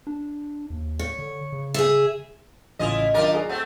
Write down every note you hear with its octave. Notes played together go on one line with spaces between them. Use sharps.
D4
D#2
C#5
D3
C#3
G#4 E5
A1 C#3 E4 F4 D#5 F7
D#3 F#3 D4 F4 A#4 D6
F#4 G#4 D5
A3 C4 F#5